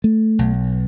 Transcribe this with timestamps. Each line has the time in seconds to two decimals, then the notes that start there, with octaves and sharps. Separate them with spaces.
0.04 A3
0.39 B1